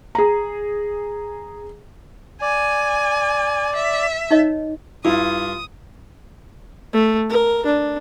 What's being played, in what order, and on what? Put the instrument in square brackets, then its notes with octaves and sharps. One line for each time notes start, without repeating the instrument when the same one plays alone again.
[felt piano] G#4 A#5
[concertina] D5 [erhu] G#5
[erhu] E5
[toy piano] D#4 C#5 D#5
[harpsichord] G2 [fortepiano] E4 [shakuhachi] F4 [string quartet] D#6
[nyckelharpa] A3
A#4
D4